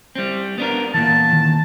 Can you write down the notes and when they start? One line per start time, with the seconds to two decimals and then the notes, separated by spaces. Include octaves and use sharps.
0.15 G3 C4
0.58 B3 D4 A#4
0.94 E2 A#2 E3 A5
1.33 D#3